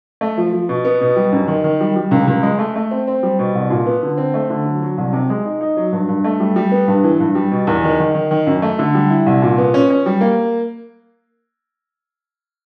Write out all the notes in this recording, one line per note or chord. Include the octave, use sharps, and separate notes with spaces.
A3
F3
F3
B2
B3
B2
G3
F#2
D#3
D#3
G3
G3
C#2
C#2
G#3
A3
A3
C4
C4
G3
B2
C2
A#2
B3
D3
C4
A3
D3
F#3
F#3
C2
C3
G#3
D#4
D#4
F#3
G2
G2
A3
G3
G3
B3
G2
E3
G2
G3
B2
E2
D#3
D#3
D#3
D#3
F#2
A3
D3
G3
E4
C2
A#2
B3
C#4
C#4
G3
A#3